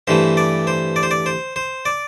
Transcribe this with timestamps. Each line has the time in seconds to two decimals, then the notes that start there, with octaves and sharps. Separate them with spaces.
0.07 G2 E3 A3 C5
0.37 D5
0.67 C5
0.96 D5
1.03 C5
1.11 D5
1.26 C5
1.56 C5
1.85 D5